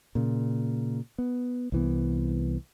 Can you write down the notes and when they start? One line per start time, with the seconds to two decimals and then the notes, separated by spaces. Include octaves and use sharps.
0.15 A#2 C#3
1.18 B3
1.72 C2 E3 B3